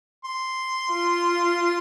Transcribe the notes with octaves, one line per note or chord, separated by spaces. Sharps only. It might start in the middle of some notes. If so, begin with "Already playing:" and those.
C6
F4